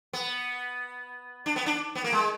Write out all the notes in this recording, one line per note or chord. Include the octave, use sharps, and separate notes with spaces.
B3
D4
B3
D4
B3
A#3
G#3